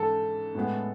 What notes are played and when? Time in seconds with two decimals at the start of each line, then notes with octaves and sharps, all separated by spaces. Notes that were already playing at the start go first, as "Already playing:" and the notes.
Already playing: G#2 E3 A4
0.55 A2 G#3 B3